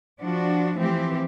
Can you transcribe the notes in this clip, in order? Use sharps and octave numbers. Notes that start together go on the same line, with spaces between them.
F3 D4 F#4
E3 F3 A3 C4 G4